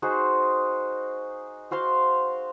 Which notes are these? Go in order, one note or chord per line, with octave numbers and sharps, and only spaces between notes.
D#4 F#4 G#4 C5
F#4 C5 F5 C6